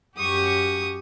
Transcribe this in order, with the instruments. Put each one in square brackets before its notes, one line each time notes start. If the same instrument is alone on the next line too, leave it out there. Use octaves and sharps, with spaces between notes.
[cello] F#2 G4 [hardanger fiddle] C#6 D#6